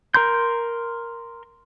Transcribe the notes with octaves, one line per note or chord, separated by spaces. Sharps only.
A#4 A#5 C6 G6